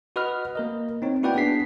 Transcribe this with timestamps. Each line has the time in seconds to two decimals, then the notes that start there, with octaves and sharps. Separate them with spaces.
0.16 F#4 B4 D#5 B5 F6
0.55 A#3 A#4 D#5
1.02 C4 D#4 C#5
1.23 A#3 E4 F#4 B4 D5 G5
1.35 B3 D4 G#4 B6 C7